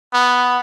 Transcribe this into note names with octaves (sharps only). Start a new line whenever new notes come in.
B3